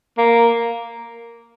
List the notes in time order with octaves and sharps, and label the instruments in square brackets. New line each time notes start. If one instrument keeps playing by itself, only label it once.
[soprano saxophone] A#3